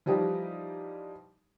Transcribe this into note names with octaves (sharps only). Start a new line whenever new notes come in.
E3 F3 G3 D#4 G4